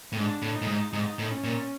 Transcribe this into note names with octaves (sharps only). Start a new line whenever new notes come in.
A2
G#2 D4
A2
D#4
A2
G#2
G#2 D#4
A2
C#4
A#2